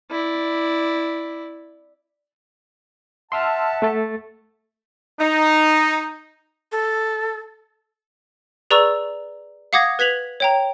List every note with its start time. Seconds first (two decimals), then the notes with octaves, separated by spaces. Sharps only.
0.11 E4 D5
3.32 E5 F#5 A5 C6 E6 F6
3.82 A3 A4 A6
5.19 D#4
6.72 A4
8.71 G#4 B4 D5 A#5 C#6 E6
9.73 F5 F#5 D6 D#6 G#6 A#6
9.99 B4 G#6 B6 F7 F#7
10.40 C#5 G5 A#5